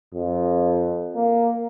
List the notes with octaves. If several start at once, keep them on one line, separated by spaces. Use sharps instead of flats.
F2
A#3